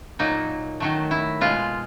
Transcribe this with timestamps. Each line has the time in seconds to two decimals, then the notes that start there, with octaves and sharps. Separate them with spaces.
0.19 A#2 F#3 A#3 D#4
0.80 D#3 F#3 A3
1.11 E4
1.41 B2 G#3 F4